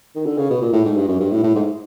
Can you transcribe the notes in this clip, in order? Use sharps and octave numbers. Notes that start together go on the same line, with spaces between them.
D#3
D3
C#3
B2
A#2
A2
G#2
G2
F#2
G2
A2
A2
G#2